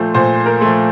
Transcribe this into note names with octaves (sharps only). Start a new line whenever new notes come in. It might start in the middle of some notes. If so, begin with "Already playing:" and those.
Already playing: A#2 F3 A3 C5
A#2 C5
A#4
F3 A3